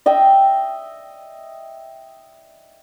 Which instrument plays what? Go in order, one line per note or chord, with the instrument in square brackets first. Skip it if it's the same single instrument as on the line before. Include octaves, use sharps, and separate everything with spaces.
[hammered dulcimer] D#5 E5 G5